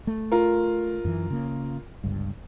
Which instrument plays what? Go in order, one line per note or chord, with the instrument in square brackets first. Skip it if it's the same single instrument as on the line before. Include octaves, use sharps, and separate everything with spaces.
[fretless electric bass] A3
[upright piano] F4 A#4
[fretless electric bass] F#2 E3
C#3 A#3
G1 C#2 G2